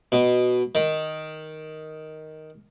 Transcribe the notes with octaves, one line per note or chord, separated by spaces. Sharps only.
B2
D#3